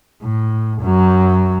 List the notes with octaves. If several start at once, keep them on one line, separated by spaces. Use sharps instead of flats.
A2
F#2 F#3